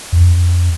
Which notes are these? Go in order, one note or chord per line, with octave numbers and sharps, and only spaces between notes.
F2